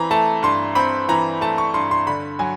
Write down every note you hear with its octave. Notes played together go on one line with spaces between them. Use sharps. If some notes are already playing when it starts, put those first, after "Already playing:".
Already playing: E3 C4 A#5 B5
A3 A5
G2 C6
C4 B5
E3 A#5
A3 A5
C#6
G2 C6
C6
D3 B5
F#3 G#5